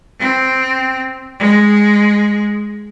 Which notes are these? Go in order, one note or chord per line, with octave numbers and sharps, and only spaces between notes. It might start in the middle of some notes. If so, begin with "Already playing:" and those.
C4
G#3